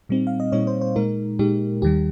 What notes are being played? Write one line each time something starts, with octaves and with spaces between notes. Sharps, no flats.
A#2 G3 C4 D#4
F5
D#5
A#2 G3 C4 D#4 C#5
C5
C5
A#2 G#3 D#4 A#4
A#2 G#3 D#4 G4
D#2 D#3 G3 G4